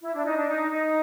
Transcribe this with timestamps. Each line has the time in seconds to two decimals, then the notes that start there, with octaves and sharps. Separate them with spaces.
0.01 E4
0.13 D4
0.25 D#4
0.36 D4
0.48 D#4
0.71 D#4